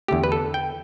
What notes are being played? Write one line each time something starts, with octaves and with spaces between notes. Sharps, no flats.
E2 D3 A3 G4
B4
A4
G5